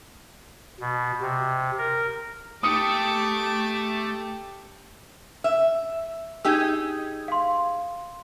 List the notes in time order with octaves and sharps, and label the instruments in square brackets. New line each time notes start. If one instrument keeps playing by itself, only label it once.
[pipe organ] B2
C3
A#4
[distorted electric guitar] A3 [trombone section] G4 [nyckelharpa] A5 D6 [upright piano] D#6 C#7
[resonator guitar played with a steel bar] E5
[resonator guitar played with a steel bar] D#4 G4 G#4 [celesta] E6 G#6
[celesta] F5 C6